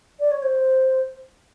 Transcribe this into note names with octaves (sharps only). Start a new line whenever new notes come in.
D5
C#5
C5